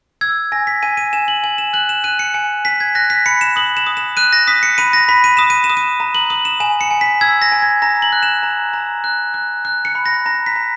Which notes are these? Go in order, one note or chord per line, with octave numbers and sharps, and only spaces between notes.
E6 G#6
G#5 A#6
B6
G#5 D#7
D#7
G#5 E7
F#7
G#5 F#7
E7
F#6 F#7
E7
F#6 D#7
C#7
G#5 C#7
G#5 B6
G#6
F#6 A#6
B6
B5 C#7
E7
D#6 F#7
E7
D#6
E7
F#6 D#7
A#6
D#6 B6
C#7
B5 D#7
A#6
B5 B6
D#7
D#6 E7
D#7
E7
D#6
D#7
A#5
F#7
D#6 F#7
E7
G#5 E7
C#7
G#5
B6
E6 G#6
A#6
G#5
G#6
A#5 A#6
F#7
F#6
E7
A#5
A#5
F#6
F#6
F#6
C#7
B5
A#6
A#5 A#6
B6
A#5